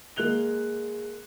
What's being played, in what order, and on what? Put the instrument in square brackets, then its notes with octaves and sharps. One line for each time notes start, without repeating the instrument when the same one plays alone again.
[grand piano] G#3 A#3 F#6 F7 G7